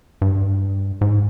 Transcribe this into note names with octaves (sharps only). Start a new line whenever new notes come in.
G2
G#2